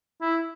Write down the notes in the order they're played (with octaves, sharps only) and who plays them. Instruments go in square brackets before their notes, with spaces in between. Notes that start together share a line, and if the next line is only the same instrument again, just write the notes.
[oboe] E4